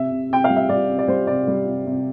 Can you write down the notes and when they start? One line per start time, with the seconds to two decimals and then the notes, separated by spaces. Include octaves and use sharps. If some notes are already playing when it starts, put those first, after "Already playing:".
Already playing: C3 E5
0.11 C3
0.29 C3 G5
0.44 F5
0.50 G3
0.56 E5
0.69 G3 D5
0.88 C3
0.99 D5
1.08 G3 C5
1.27 C3 D5
1.47 G3
1.66 C3
1.86 C3